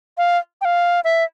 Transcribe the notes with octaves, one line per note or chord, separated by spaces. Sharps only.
F5
G5
F5
E5